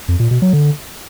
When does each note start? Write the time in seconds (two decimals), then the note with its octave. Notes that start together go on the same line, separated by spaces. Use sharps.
0.08 F2
0.20 A#2
0.31 B2
0.42 F#3
0.53 D3